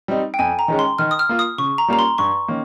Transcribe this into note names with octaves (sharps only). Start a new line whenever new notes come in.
G3 C4 D#4
G5
F2 G#5
A#5
D#3 G#3 C#4
C6
D#3 F6
D#6
F6
A#3 F4
D#6
C#3 C#6
A#5
G3 A#3 C#4 F4 A#5
C6
G2 C#6
D#3 A#3 C#4